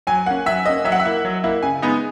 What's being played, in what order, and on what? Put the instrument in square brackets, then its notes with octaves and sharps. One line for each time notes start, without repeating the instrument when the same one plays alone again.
[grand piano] F#3 [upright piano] G#5
[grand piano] A#3 C#4 [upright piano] F#5
[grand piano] F#3 [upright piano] E5
[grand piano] A#3 C#4 [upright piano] D#5
[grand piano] F#3 [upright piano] E5
[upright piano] F#5
E5
[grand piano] A#3 E4
F#3
A#3 E4
[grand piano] C#3 [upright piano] G#5
[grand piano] G#3 B3 D#4